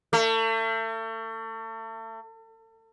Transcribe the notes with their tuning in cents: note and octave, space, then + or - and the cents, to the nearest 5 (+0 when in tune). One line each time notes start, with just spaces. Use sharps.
A3 +35